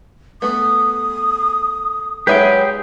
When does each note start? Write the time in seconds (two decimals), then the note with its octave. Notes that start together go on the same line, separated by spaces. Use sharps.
0.42 A3 B3 D#6
2.27 F#3 G#3 D#4 G4 G#4 B4 E5 G5